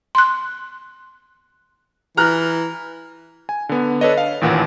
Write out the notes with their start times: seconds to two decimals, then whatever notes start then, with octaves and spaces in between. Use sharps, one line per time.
0.15 C6 F#6
2.17 E3 A#5 F6 F#6
3.49 G#5
3.69 D3 B3
4.01 D4 A4 B4 C#5 D#5
4.18 F5
4.41 A1 D#2 A#2 E3 F#5